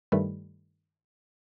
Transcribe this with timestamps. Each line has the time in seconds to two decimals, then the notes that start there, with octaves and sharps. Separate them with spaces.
0.12 G2 D#3 G3 A3 B4